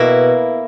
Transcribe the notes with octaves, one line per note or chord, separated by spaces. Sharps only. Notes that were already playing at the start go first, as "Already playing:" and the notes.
Already playing: B2 A#3 E4